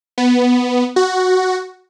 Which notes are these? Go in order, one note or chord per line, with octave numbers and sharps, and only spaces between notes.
B3
F#4